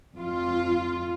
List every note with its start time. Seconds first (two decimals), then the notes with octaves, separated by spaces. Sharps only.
0.15 F2 F4